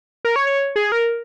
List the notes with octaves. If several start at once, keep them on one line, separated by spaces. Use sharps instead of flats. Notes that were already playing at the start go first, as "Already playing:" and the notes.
A#4
C#5
C#5
G#4
A#4